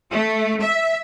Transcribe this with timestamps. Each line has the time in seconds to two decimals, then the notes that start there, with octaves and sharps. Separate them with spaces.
0.11 A3
0.60 E5